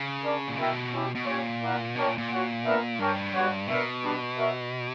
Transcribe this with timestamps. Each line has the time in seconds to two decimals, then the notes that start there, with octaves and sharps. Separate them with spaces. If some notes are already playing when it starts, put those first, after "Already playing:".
Already playing: C#3
0.23 D4 A#4 D5
0.48 A#2
0.57 B2 E4 A#4 E5 G5
0.92 C#4 E4 G4
1.15 B2
1.26 A#2 C#4 G4 C#5
1.61 A#3 E4 A#4 D5 F#5
1.95 B2 D4 A#4 C#5 G5
2.07 A#2
2.18 A#2
2.30 F#4 C#5 F#5
2.64 B3 D4 A#4 E5
2.98 G2 D4 A#4 C#5 G5
3.33 G3 B3 F#4 C#5 F#5
3.67 B2 B3 D4 A#4 E5
4.02 G3 B3 D4
4.36 F#4 A#4 C#5 E5